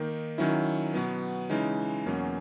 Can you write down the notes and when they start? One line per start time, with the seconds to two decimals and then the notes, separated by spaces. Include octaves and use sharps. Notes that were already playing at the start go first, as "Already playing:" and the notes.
Already playing: D#3 A#3 D#4
0.38 D#3 F#3 C#4 E4
0.93 B2 F#3 B3
1.50 C#3 E3 G#3 D#4
2.06 E2 B2 F#3 A#3 C#4